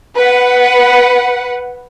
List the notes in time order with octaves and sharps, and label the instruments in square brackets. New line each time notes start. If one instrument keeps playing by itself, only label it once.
[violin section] B4 F#5